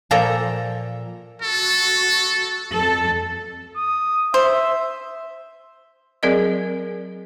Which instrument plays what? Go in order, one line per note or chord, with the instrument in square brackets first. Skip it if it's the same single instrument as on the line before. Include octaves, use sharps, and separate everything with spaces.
[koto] A#2 F3 A#3 A4 G5 A#5
[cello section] F#4 [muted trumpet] A4
[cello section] F2 A4
[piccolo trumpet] D#6
[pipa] C5 [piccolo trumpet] E5
[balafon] F#3 C4 G#4 A#4 D5 D#5